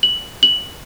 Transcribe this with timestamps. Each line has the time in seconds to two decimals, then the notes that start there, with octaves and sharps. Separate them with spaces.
0.03 F#7
0.43 F#7